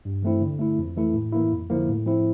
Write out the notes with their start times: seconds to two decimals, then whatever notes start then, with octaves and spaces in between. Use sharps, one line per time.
0.05 G2
0.23 E3 A3 C4 E4
0.41 D3
0.59 A3 E4
0.79 F2
0.97 E3 A3 E4
1.14 A2
1.33 E3 A#3 E4
1.52 F2
1.70 D3 F3 A#3 E4
1.89 A2
2.06 F3 C4 E4